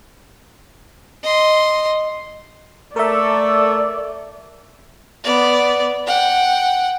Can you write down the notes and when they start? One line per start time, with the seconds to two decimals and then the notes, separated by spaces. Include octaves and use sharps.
1.23 D#5 C6
2.96 A3 A4 A#4 D5 E5
5.24 B3 D5
6.07 F#5 G5